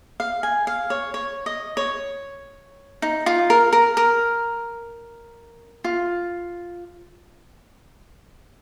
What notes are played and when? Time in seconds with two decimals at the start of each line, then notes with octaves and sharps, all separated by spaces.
0.20 F5
0.43 G#5
0.67 F5
0.90 C#5
1.14 C#5
1.46 D#5
1.77 C#5
3.02 D#4
3.26 F4
3.50 A#4
3.73 A#4
3.97 A#4
5.84 F4